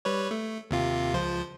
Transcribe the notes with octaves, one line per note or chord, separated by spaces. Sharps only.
G3 B4 C#5
A3
D#2 C3 F4
C#2 F3 C5